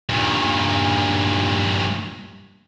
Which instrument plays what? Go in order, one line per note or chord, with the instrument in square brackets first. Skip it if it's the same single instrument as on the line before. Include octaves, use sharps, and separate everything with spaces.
[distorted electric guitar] G2 A#2